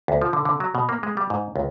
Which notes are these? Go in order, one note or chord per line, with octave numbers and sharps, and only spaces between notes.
D2
F3
D3
D3
F#3
B2
A#3
G#3
G3
G#2
C#2